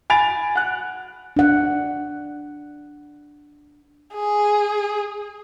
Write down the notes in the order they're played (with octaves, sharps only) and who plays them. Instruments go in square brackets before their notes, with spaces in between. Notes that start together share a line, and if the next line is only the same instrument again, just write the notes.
[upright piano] G#5 B5 A6 D7 F7
F#5 F#6
[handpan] D4 F#5
[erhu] G#4